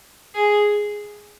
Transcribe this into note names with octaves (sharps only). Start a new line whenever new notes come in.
G#4